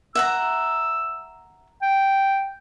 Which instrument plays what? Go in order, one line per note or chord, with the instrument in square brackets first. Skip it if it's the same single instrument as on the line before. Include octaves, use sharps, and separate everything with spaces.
[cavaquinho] E5 F#5 A#5 [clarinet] E6
[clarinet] G5